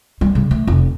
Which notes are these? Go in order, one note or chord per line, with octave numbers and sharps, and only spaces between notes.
F3 G3
C#3
A3
F1